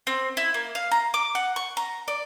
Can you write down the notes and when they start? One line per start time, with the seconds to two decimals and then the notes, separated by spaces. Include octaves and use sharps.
0.07 C4
0.37 E4
0.54 A#3
0.75 F5
0.91 A#5
1.14 D6
1.35 F#5
1.56 C#6
1.77 A#5
2.08 D5